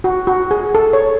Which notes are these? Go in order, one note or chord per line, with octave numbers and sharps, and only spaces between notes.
F#4
F#4
G#4
A4
C#5